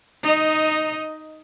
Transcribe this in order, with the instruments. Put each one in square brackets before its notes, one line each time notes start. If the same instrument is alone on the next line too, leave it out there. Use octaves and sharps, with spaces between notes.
[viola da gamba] D#4 D#5